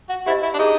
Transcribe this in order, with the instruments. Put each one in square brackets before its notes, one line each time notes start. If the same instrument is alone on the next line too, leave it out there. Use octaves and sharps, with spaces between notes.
[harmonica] F#4
[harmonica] E4 [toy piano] G4 C5 D#5
[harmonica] E4
D4
[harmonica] D#4 [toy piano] G#4